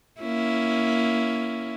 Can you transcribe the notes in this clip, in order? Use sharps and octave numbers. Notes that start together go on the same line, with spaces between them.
A#3 C#4 E4